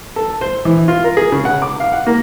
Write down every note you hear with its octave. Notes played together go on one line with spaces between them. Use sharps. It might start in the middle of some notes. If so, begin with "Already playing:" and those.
A4
C5
E3
F4
A#4
G#4
C#3
F#5
D6
F5
F#5
A#3